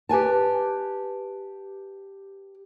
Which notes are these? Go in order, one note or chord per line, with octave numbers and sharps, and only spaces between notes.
G4 B4 G#5 A5